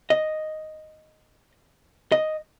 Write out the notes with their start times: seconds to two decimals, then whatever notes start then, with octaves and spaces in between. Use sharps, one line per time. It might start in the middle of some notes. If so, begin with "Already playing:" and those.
0.10 D#5
2.12 D#5